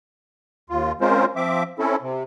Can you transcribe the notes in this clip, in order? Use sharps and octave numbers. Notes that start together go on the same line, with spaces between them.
D#2 F4
G#3 C4 C#4 F4 A#4 C5
F3 C4 E5 D6
C4 C#4 E4 A4
C3